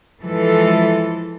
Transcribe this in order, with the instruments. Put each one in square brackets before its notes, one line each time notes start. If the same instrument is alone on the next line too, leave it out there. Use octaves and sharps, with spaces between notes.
[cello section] E3 F3 G#3 A4